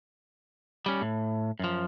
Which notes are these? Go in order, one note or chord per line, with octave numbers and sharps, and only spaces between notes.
G3 C#4
A2
F#2 F3